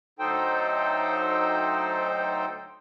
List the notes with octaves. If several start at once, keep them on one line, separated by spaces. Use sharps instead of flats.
D2 F#3 D#4 A4 C5 G5